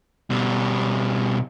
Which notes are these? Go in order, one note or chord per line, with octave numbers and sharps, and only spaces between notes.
B2 G3